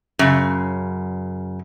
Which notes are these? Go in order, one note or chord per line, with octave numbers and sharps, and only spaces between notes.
F#2 C#3